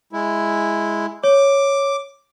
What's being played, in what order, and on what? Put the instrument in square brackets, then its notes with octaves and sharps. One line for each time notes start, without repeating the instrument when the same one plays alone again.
[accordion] G#3 E4
[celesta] C#5 [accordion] D6